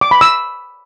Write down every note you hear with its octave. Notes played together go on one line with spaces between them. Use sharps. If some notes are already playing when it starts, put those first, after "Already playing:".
D6
B5
E6